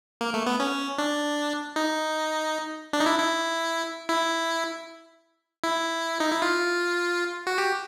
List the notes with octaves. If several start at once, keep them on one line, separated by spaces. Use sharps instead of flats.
A#3
A3
B3
C#4
D4
D#4
D4
D#4
E4
E4
E4
E4
D#4
E4
F4
F#4
G4